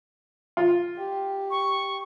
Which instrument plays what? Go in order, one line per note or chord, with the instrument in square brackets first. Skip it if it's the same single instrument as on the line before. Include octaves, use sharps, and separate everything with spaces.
[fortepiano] F4
[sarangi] G4
[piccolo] C#6